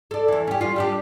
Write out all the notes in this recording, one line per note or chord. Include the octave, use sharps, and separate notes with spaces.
A4 D5
E2 E3
C#4 G4
G3 F4
G3 D4 G4